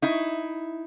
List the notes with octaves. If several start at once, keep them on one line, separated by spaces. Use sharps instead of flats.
D#4 E4